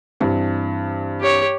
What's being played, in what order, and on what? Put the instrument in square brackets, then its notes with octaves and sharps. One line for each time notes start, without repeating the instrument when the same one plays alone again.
[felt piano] G2 E3 C4
[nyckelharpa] G4 C#5